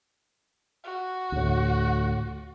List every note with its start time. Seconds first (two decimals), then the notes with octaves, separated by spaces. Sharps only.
0.84 F#4
1.32 D2 A2